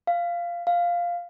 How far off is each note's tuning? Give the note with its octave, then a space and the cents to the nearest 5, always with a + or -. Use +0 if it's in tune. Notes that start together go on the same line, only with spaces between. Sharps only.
F5 -10
F5 +0